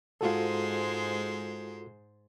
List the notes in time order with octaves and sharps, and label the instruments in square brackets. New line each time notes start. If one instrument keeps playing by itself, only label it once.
[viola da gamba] G#2 G#3 C5 [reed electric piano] F4 F#4 A4